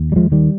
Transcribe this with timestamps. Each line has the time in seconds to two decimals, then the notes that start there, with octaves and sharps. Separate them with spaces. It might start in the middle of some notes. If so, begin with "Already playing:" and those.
Already playing: D#2
0.12 G3
0.16 F3 G#3
0.32 D#3 G3